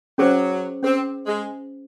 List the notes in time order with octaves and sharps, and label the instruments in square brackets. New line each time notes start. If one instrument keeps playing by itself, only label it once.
[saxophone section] F#3 [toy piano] C#4 G#4 C5
[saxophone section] C4 [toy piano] C#4 G#4 C5
[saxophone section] G#3